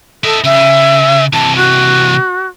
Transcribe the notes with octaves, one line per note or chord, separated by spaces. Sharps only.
E4 A4 D#5
C#3 E5
C3 E3 A5
F#4